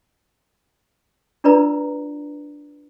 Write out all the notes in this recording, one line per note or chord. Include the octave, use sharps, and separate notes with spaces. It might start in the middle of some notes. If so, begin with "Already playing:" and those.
D4 F4 A#4 B4 D5 A#5